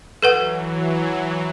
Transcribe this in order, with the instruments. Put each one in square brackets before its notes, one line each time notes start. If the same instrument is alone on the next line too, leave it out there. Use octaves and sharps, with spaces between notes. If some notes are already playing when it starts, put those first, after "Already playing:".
[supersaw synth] E3 F#3 [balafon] A4 B4 F#5